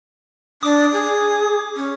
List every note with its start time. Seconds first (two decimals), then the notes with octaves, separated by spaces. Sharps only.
0.63 D4 D6 D#6
0.92 G#4
1.77 C#4